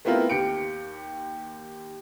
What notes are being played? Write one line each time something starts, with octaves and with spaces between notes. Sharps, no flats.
A3 B3 C4 E4 F4 A#4
D#2 G4 C#7 D7